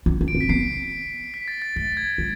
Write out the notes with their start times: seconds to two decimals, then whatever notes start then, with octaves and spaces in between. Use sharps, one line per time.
0.06 C#4
0.21 C#4
0.28 D7
0.35 C4
0.41 B6
0.49 B3 C7
1.34 B6
1.48 A6
1.62 A6
1.76 A3 A6
1.97 G#6
2.18 G#3